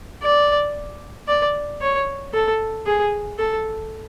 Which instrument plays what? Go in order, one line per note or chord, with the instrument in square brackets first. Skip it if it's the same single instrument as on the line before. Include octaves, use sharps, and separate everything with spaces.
[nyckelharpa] D5
D5
C#5
A4
G#4
A4